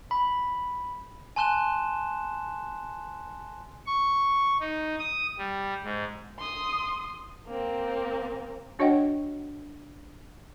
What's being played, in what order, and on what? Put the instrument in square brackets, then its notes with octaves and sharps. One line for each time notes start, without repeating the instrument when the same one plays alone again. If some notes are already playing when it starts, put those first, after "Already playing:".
[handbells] B5
[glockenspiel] G#5 A5 C6 F#6 E7 G7
[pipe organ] C#6
D#4
D#6
G3
G#2
[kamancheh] C6 D#6
A#3 C4
[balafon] D4 F#4 C#5 D#5 F#5 G5